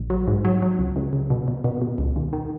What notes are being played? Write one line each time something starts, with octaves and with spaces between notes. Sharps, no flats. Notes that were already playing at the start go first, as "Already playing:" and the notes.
Already playing: A#1
F#3
G#2
F#3
F#3
C#2
C#2
C#2
B2
B2
B2
B2
C#2
D#2
D#3